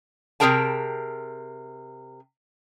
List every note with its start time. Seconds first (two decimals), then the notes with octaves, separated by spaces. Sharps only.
0.40 C3 F4 G#4 A#4 G5 A5